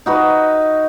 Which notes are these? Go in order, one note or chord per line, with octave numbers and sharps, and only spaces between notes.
D#4 F#4 B4